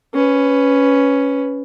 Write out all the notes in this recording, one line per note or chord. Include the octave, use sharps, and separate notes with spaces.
C#4 B4